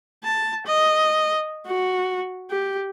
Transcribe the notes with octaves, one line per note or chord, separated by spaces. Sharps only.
A5
D#5
F#4
G4